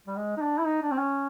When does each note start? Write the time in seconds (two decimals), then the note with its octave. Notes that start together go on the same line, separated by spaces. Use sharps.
0.07 G3
0.16 G#3
0.37 D#4
0.42 D4
0.58 E4
0.66 D#4
0.83 D4
0.92 C4
0.99 C#4